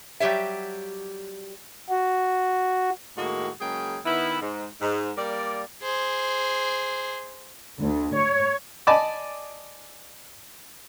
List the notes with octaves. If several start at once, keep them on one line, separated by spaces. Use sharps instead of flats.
F#3 G3 G4 C#5 E5
F#4
A2 D#3 G#3 A#3 F#4
C#3 F#3 G#3 A#3 G#4 G5
D#3 B3 E4
G#2
G#2
G3 A#3 A#4 D5
G#4 C5
D2
C#5
D5 D#5 G#5 A5 B5 D6